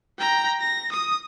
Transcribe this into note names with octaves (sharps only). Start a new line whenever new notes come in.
G5 A#5
A#6
D#6